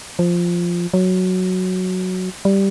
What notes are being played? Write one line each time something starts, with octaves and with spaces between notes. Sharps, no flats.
F3
F#3
G3